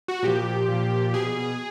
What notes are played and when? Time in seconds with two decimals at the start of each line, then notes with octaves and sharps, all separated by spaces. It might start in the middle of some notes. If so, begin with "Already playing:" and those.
0.08 F#4
0.23 A#2 F3 G4
0.68 A#2 F3
1.13 B2 G#4